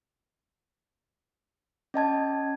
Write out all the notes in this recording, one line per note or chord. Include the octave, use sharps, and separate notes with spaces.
C#4 D#5 A5 G#6